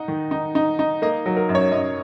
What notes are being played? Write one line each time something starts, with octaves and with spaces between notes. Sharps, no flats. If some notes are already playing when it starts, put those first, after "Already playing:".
Already playing: D#4 F#5
D#3
D#4
D#4
D#4
A#3 D#5
F#3
A#4
F#2
C#5
F#2 D#5